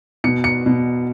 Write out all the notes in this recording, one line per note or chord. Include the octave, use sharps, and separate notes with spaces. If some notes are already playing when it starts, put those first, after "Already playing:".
B2 C#7
C#7
B2